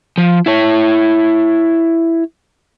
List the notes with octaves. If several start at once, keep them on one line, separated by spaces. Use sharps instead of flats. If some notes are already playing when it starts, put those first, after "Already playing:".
F3
E4 C#5